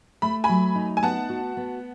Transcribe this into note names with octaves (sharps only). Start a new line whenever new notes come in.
A3 B5
G#5 B5
F#3
D#4
G#5
B3 F#5 A5
F#4
B3